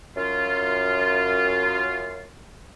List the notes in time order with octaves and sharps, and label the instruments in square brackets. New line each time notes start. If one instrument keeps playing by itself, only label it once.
[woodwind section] F#2 F4